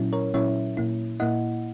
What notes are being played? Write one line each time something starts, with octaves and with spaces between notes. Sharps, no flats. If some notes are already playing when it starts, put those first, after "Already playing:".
Already playing: A#2 F#3 C#4 E4
A#4 C#5
A#2 F#3 C#4 E4 C#5 E5
A#2 A#3 E4
A#2 A#3 E4 D#5 F#5